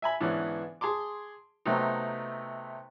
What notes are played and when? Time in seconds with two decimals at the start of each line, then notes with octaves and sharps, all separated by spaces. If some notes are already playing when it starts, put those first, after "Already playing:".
0.02 E5 G#5 B5
0.20 G#2 D3 E3 B3 C#4 D4
0.81 G#4 A5 C6 D6
1.66 C3 F#3 A3 B3 C4 D#4